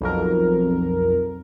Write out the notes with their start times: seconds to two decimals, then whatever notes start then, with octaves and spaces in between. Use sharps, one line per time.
0.01 B1 F2 A#4